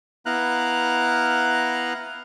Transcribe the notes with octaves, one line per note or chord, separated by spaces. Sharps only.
B3 E4 F5 A#5 F#6